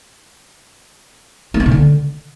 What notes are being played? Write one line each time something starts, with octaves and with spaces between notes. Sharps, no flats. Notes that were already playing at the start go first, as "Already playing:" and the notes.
A#3
B3
C3
D3